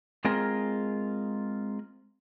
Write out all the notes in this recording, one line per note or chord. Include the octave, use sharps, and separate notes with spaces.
G#3 C4 F4 G#4 A#4